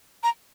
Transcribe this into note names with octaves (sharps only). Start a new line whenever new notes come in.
A#5